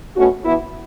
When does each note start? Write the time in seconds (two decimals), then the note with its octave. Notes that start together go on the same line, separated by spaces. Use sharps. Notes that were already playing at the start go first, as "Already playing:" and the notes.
0.16 B2 A3 C#4 F#4
0.44 E3 B3 E4